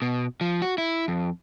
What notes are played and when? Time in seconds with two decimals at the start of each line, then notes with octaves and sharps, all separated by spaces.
0.02 B2
0.41 F3
0.62 F#4
0.78 E4
1.08 F2